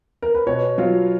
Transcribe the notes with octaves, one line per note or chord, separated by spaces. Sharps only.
A#4
B4
B2 C#5
F#3 F4